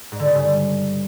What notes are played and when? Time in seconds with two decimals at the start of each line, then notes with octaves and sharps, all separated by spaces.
0.12 G#2
0.19 D3
0.27 C#3
0.35 G2